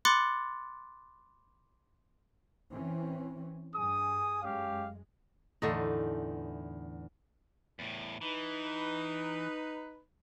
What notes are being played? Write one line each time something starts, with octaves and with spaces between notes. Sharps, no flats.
B5 C6 D6 F#6 A6 C#7
E3 C4 C#4
G2 G#4 G#5 D#6
F#2 G#3 C#4 G4 F5
E2 A2 D3 E3 A3 D#4
E2 A2
E3 D#4 B4